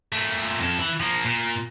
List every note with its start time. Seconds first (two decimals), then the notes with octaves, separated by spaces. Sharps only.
0.13 A#2 A3
0.59 F2 A4
0.79 E3 E4
1.00 F3 A#3
1.25 A#2